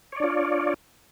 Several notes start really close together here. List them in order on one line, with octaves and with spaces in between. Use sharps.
C#5 D5 D4 F4